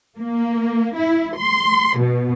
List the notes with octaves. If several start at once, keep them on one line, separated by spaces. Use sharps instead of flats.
A#3
E4
C6
B2